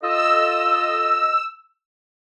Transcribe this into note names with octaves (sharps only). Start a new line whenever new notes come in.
F4 A4 D#5 E6